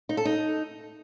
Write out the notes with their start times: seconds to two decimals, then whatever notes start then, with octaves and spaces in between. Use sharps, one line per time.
0.09 D#4
0.17 A4
0.25 D#4